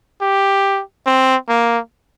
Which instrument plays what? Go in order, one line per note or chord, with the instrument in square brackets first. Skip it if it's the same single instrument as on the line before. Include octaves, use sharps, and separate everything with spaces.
[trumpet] G4
C4
A#3